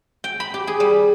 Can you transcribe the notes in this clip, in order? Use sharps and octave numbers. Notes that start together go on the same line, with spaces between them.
G5
B5
G4
G#4
G3